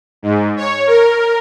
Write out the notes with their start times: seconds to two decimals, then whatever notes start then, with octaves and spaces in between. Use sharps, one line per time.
0.22 G#2
0.57 C#5
0.87 A#4